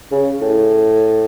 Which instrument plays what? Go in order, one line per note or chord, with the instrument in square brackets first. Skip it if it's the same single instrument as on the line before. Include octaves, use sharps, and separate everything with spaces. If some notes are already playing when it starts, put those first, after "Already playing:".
[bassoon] C#3
A2